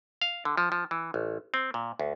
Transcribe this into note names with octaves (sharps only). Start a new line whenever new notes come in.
F5
D3
F3
F3
E3
A1
C4
A#2
D2